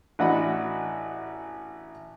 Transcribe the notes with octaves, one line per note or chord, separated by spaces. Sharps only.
A1 D4 F#4 D#5 F#5 B5